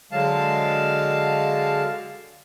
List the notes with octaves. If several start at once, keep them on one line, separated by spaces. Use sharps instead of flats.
D3 F#3 G#3 F5 A5